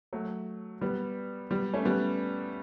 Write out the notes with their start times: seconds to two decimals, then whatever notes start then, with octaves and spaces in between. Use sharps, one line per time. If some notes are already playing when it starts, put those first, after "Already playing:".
0.13 F#3 A3
0.81 G3 B3
1.51 G3 B3
1.74 A3 C#4
1.85 G3 B3